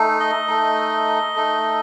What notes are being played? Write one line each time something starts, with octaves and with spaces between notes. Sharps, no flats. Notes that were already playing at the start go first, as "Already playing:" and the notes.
Already playing: A3 D#4
D#5
A3 D#4
A3 D#4